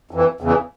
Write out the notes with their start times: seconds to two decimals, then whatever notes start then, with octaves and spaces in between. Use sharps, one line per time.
0.11 F2 E3
0.41 E2 C#3 E3